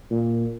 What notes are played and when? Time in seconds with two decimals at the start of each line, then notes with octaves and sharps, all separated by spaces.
0.11 A#2